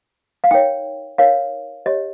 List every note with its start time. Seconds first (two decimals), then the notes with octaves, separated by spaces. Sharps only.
0.44 F5
0.51 D#4 A#4 C#5 G5
1.18 D#4 A#4 C#5 F5
1.86 G4 C#5 D#5